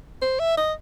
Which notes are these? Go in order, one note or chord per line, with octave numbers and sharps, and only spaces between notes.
C5
E5
D#5